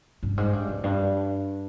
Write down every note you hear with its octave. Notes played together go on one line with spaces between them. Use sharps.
G2
G#2
G2
F2
G2